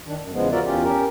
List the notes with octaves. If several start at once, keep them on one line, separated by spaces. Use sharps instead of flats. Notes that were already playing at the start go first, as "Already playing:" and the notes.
D#3 D4
F#2
E2 C#3 F3 G#3 B3
F4 F#4 A#4 D5 E5
E2 C#4 F4 G4
C#4 G4 A#4